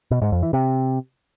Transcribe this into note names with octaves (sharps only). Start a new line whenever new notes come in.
B2
G#2
F2
E3
C3